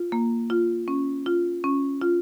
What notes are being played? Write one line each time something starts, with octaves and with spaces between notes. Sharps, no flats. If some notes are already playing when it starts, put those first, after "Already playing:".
Already playing: F4
A#3
F4
C#4
F4
C#4
F4